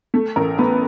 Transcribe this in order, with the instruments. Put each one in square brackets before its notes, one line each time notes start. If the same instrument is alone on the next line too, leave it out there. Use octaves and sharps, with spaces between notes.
[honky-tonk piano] A3
A1 A#4
A3 B3 B4